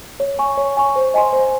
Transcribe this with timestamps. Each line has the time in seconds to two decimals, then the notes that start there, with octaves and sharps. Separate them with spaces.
0.20 C#5
0.39 G#5 C#6
0.57 C#5
0.77 G#5 C#6
0.96 C5
1.14 D#5 G#5 C6
1.33 C5